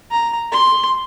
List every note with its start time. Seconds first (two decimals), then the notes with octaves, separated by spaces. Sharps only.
0.11 A#5
0.52 C6